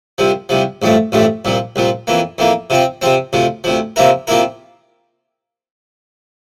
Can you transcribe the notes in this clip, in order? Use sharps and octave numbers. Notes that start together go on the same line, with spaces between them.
C2 C3 F3
C2 C3 F3
A1 G2 F3 A3
A1 G2 F3 A3
C2 A#2 F3
C2 A#2 F3
F2 E3 A#3
F2 E3 A#3
C3 F3 C4
C3 F3 C4
D2 C3 F3
D2 C3 F3
C3 F3 A#3 E4 A#4
C3 F3 A#3 E4 A#4